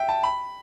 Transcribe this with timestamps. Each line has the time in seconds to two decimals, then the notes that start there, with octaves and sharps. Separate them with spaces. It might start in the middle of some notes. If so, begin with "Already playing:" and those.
Already playing: E5 G5
0.09 A5
0.23 B5